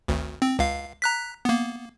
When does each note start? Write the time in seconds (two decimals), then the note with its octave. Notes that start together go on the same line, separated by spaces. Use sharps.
0.08 G#1 D2
0.42 C4
0.59 C#2 F5
1.02 A#5 F#6 B6
1.45 A#3 B3